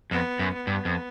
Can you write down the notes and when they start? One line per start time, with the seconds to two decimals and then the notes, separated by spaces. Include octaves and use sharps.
0.11 F2 B3
0.39 F#2
0.54 B3
0.67 G2
0.85 F2